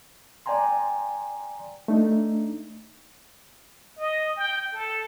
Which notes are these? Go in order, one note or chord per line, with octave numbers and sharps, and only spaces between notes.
D5 G5 G#5 A#5 C6
A3 D4 D#4
D#5
G5
A4